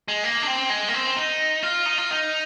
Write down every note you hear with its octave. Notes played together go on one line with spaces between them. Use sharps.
G#3
A#3
D4
C4
G#3
A#3
C4
D#4
F4
D#4
F4
D#4